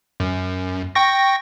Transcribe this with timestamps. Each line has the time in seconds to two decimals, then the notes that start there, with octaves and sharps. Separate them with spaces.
0.20 F#2
0.95 G5 C#6 A#6